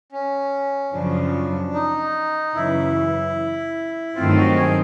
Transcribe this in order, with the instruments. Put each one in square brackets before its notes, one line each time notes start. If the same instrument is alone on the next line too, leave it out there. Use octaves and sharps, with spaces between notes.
[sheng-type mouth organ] C#4
[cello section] F#2 C#3 F3 [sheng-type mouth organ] D4
[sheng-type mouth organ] D#4
[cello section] F#2 C#3 E3 [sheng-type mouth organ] E4
[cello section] G2 D#3 F#3 A3 C4 [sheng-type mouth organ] F4
[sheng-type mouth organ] F#4
G#4